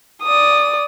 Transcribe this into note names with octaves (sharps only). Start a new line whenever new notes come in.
D5 D#6